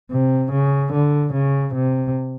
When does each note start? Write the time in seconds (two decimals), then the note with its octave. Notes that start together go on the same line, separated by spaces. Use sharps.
0.11 C3
0.52 C#3
0.92 D3
1.33 C#3
1.74 C3